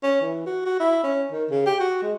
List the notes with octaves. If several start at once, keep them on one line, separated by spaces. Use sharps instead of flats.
C#4
E3
F#4
F#4
E4
C#4
D#3
C#3
G4
F#4
G#3